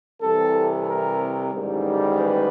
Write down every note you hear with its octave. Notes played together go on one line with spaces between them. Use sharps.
C2 C3 E3 A4
A#4
A1 G#2 D#3 G3
B4